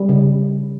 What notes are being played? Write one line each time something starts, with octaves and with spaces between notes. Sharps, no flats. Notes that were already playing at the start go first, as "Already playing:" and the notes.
Already playing: G3
C#3